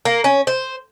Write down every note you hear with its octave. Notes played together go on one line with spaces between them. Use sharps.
A#3
C#4
C5